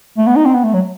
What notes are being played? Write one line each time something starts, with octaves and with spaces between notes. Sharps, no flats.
A3
B3
D#4
C4
B3
A3
F#3